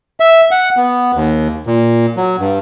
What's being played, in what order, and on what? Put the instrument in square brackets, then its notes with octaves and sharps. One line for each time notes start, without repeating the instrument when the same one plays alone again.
[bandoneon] E5
F#5
B3
D#2
A#2
F#3
G2